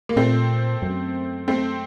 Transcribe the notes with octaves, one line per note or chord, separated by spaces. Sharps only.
A#3
A#2 A3 C4
F#2
A3 C4